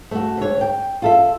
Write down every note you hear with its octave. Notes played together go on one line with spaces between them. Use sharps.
A3 F#4
D2 C#5
G5
F4 A4 E5